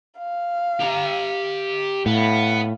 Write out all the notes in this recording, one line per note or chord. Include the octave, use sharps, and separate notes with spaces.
F5
G4 A#5
A2 B3 F5